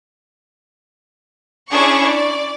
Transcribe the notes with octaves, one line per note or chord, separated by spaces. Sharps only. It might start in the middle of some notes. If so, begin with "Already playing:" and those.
C#4 D4 E4 G#4 C#6
D5